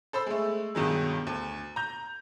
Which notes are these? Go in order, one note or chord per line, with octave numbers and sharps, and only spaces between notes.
A4 C5 B5 E6
G#3 A3
G2 B2 D#3 F#3 G#3
D2
A#5 G6